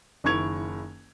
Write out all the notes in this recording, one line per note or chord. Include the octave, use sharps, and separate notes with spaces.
F#1 D#3 E4 C#6 G#6 F7